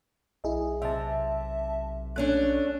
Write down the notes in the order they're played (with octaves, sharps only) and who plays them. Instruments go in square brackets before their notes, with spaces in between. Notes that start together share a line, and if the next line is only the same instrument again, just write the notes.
[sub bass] B1 [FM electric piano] E4 G#4 D#5
[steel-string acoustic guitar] C3 [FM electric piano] E5 A5
[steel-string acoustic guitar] A3 C#4 D4 [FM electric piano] F#6